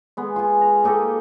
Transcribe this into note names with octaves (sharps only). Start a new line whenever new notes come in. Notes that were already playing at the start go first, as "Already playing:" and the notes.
G#3 B3
F4 G#5
A#5
A#3 D#4 G4 A4